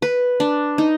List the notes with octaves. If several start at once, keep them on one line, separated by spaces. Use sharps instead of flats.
B4
D4
D#4